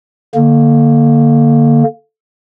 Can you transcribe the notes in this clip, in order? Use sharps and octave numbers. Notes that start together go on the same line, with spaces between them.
D3 A#3